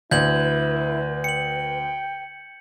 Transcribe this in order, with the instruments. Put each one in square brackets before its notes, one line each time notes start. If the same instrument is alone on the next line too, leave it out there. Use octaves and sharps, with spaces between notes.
[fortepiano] D2 [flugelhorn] E4 [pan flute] B4 [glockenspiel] G6 G#6 F#7
[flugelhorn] G5 [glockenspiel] C#7 F#7